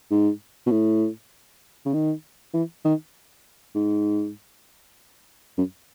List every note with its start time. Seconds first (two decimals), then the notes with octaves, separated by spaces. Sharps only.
0.11 G#2
0.66 B2
0.71 A2
1.85 C#3
1.93 D#3
2.54 E3
2.85 D#3
3.75 G#2
5.58 F#2